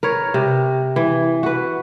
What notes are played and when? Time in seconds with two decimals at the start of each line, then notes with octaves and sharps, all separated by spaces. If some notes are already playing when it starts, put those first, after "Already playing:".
0.03 A#4 B4 C#5
0.34 C3
0.96 E3
1.43 F#4 B4